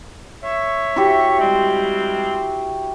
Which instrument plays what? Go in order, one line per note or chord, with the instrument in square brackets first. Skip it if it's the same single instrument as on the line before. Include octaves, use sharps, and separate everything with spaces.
[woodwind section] C#5 E5 C#6
[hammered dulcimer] E4 F#4 G4
[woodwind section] G3 G#3 C4